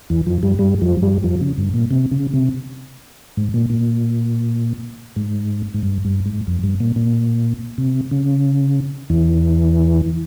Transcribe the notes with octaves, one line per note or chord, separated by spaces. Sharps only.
E2 E3
F2 F3
G2 G3
G2 G3
F2 F3
G2 G3
F2 F3
C#3
G2
A#2
C3
C#3
C3
G#2
A#2
A#2
G#2
G#2
G2
G2
G#2
F2
G2
A#2
A#2
C3
C#3
E2 E3